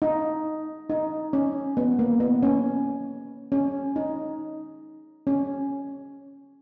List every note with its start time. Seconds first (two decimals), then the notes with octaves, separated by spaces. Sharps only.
0.02 D#4
0.90 D#4
1.33 C#4
1.77 B3
1.99 A#3
2.20 B3
2.43 C#4
3.52 C#4
3.96 D#4
5.27 C#4